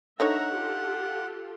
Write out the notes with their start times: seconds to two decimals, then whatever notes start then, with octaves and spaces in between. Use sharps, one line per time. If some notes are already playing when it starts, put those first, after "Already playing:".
0.20 D3 D#4 C#5 E5 F#5 A#5
0.52 F4 G4 A4